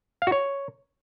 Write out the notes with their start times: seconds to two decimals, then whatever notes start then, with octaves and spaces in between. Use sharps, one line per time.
0.22 F5
0.27 F#4
0.32 C#5